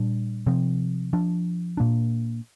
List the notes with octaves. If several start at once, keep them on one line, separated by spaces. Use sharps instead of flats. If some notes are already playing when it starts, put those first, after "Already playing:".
Already playing: A#2 G3 D4
C3 F3 C4
F3 D4
A#2 A#3 D4